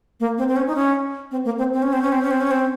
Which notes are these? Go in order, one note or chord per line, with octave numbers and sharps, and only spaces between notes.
A#3
C4
C4
C#4
D#4
C#4
C4
A#3
C4
C4
C#4
C4
C#4
C4
C#4
C4
C#4
C4